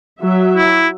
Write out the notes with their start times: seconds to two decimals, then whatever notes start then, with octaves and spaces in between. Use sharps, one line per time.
0.20 F#3 E5
0.57 E4